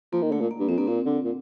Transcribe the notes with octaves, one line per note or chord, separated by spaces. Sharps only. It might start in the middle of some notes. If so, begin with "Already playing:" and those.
F3 A#3
D#3
D3 A3
A#2
A#3
G2
F2 C4
G2 A#3
A#2 C4
D3
A#2